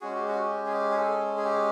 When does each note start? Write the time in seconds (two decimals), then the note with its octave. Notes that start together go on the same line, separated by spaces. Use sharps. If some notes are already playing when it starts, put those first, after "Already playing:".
0.01 G#3 C#4 F#4 G#4
0.15 G4
0.28 F#4
0.40 G4
0.66 G#4
0.72 G4
0.92 G#4
0.97 A4
1.37 G#4
1.45 G4